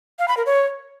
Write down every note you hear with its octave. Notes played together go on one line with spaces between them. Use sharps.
F5
B5
A#4
C#5